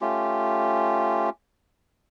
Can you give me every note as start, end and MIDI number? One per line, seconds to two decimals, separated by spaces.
0.01 1.29 57
0.01 1.29 61
0.01 1.29 65
0.01 1.29 67